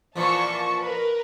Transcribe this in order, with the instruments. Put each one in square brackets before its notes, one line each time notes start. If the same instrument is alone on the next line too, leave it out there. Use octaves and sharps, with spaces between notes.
[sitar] A#2 E3 F3 [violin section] A5 C#6
[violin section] A#4 B4